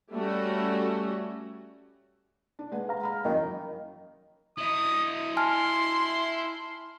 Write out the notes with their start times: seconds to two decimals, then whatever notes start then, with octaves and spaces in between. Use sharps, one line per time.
0.12 G3 A3 C#4 F#4
2.59 D4
2.72 G#3 B4 F#5
2.88 G#4 F5 A#5
3.03 B5 F6
3.25 F#2 D#3 E3
4.58 E4 D#5 D#6
5.37 G#5 A5 C6 F6